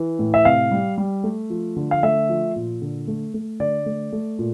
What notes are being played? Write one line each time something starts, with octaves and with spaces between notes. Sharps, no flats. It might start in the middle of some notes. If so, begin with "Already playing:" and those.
Already playing: E3
A2
E5
C3 F5
G3
G3
A3
F3
D3
F5
A3 E5
F3
A#2
D3
A3
A3
D3 D5
A3
A3
A#2